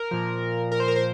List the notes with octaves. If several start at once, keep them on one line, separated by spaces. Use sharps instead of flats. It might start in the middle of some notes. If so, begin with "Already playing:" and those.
Already playing: A#4
A#2 F3
A#4
C5
A#4
C5